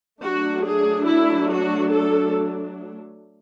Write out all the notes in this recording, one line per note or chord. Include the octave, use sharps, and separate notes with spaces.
F#3 A3 D4 F#4
G#4
E4
F#4
A4